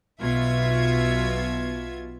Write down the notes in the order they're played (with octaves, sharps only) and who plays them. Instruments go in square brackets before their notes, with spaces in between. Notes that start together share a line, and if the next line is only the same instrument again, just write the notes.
[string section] B1 B2 F4 E5 G#6